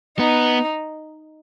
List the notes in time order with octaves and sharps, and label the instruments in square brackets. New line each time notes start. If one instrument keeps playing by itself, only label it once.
[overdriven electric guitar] B3 [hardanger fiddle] D#4